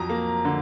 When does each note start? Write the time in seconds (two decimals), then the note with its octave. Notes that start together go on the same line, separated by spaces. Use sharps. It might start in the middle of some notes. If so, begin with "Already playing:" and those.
Already playing: F2 F#3 A#5
0.09 A#3
0.45 D3